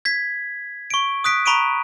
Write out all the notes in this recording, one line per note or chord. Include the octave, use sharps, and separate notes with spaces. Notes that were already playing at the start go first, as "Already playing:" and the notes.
G#6 B6
C#6 D7
D#6 F#6 B6 D7
A#5 B5 C#6 D7 D#7